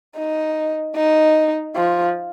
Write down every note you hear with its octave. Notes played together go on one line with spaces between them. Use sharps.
D#4
D#4
F3